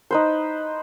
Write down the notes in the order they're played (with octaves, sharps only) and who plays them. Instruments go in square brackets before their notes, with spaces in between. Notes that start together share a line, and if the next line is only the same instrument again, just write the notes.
[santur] D#4 B4 C5